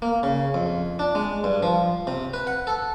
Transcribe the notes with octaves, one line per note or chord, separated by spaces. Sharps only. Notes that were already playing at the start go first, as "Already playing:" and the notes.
A#3
C#3
F2
D4
G#3
G2
F3
C3
B4
F#5
A4